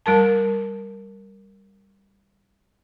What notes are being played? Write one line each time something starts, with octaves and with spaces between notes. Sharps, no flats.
G3 A#4 A5